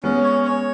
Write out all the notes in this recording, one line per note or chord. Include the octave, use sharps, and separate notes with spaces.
G#3 B3 C#4
C#5
C#5